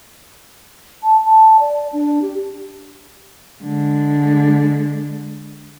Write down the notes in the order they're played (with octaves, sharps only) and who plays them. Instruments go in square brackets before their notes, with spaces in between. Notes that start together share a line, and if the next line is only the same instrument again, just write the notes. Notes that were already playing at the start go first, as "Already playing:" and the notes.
[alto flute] A5
A5
D5
D4
G4
[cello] D3 G#3